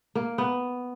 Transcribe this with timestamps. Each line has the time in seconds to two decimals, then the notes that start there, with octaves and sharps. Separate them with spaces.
0.15 A#3
0.38 B3